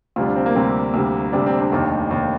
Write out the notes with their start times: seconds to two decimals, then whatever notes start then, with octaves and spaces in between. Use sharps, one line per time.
0.16 D2 C3 G3 F4
0.26 D4
0.36 C4
0.46 A#3
0.55 D2 C3 G3 C4
0.94 D2 C3 G3
1.33 D2 C3 G3 D4
1.46 C4
1.60 D4
1.72 F1 D#2 D#3
2.11 F1 D#2 D#3